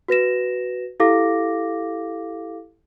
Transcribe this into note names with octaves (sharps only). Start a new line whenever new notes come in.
F#4 B4 A#6 E7
E4 G4 A4 F5 D6 A#6